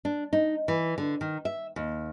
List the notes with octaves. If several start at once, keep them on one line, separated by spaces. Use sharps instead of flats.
D4
D#4
E3
D3
D#3
E5
D#2